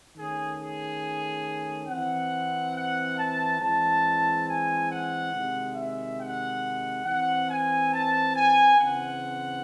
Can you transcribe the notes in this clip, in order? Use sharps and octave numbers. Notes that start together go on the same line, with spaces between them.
D#3 A3 C#4 G#4
G#4
E3 C4 F#5
F#5
A5
E3 G#3 C4 A5
G#5
F#5
C3 D#3 G#3
E5
F#5
E3 C4 F#5
G#5
A5
G#5
C#3 E3 C4 F#5